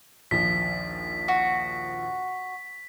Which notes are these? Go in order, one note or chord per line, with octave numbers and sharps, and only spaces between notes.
A#1 D#2 F3 B6
F#4